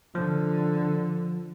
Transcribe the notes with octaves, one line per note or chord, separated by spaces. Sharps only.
D3 F3